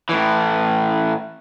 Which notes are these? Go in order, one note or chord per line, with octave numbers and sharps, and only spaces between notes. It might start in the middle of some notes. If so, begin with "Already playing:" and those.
A2 E3